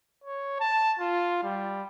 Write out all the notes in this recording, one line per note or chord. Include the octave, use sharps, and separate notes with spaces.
C#5
A5
F4
G3